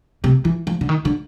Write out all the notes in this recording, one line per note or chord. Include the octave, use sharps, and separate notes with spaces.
C3
E3
F3
D3
D#3
D3